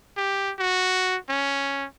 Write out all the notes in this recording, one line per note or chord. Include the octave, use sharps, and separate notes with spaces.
G4
F#4
C#4